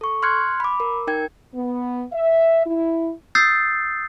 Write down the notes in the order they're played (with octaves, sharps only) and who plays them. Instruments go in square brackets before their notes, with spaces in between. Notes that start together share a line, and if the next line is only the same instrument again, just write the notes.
[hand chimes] A4 C#6
C6 F6 F#6 G#6 C#7
B5 D6
A#4
D#4 A#4 G5 G#6
[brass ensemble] B3
E5
E4
[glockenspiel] D#6 E6 G6 A6 C7